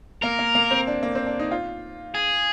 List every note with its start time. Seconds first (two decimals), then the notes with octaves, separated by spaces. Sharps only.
0.22 A#3 A#4
0.39 A#3
0.55 A#3
0.71 C4
0.87 D4
1.03 A#3
1.15 C4
1.26 D4
1.40 D#4
1.51 F4
2.15 G#4